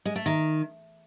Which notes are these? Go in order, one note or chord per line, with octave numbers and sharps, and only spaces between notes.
G#3
A3
D#3